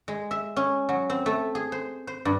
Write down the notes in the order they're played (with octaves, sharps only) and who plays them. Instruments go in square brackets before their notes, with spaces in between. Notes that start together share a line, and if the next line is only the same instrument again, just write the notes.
[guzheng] G#3
E5
C#4
F#3
C4
A3
G#4
C5
C5
G2